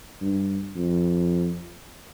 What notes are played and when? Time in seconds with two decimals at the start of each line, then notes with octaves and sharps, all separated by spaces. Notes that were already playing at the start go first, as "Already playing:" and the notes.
0.21 G2
0.76 F2